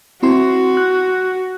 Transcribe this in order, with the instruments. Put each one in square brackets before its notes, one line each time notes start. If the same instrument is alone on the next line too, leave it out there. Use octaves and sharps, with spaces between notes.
[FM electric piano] C4 E4 C6 [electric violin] F#4
[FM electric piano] F#6